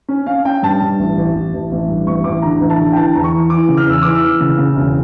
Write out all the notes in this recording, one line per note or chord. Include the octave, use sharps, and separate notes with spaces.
C#4
C#4 F5
C#4 G5
G2 A5
G2
A1
A1
A1
A1
A1
G2
A1 C#6
A1 D6
D3 A#5
A1
A5
D3
G5
E3 A5
E2 A#5
C#6
E3
E3 D6
C#3
F6
E2 E6
E3 D6
E6
E3
C#3
C#3
E1